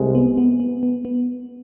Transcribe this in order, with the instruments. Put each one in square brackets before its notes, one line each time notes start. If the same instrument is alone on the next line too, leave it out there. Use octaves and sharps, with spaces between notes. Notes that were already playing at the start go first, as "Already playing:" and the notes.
Already playing: [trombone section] C2 C3 G#3
[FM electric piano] B3
B3
B3
B3
B3